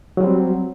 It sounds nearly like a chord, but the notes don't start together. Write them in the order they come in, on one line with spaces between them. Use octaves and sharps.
F#3 G3 C4